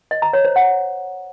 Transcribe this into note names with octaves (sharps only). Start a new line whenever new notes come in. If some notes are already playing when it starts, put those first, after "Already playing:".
D#5
A#5
C#5
C5
F#5